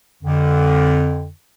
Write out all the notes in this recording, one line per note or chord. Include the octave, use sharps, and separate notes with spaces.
F2 D3